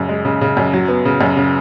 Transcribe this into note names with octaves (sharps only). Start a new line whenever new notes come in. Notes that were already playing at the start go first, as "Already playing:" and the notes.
Already playing: F#2 C#3
G#3
C#3
C#3
F#2
F#3
B3
C#3
F#2
C#3